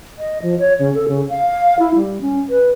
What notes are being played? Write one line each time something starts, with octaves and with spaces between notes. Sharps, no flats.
D#5
F3
C#5
C#3
A4
C#3
F5
E4
G3
C#4
B4